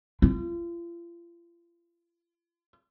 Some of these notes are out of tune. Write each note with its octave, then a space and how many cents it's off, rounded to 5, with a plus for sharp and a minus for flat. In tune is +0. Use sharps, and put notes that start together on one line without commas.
F4 -40